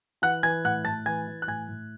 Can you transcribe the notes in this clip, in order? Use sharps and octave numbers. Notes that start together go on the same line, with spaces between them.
E3 F#5 F#6
E3 G#5 G#6
A2 F#5 F#6
A2 A5 A6
E3 G#5 G#6
E3
F#6
A2 G#5 G#6
A2